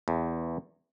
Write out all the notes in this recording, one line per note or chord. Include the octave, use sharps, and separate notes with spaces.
E2